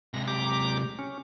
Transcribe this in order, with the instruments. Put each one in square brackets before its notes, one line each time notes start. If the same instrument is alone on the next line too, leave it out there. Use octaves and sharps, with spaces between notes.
[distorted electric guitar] C3 G#3 [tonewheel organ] A#6
[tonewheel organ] G4 A#5 D6
C#4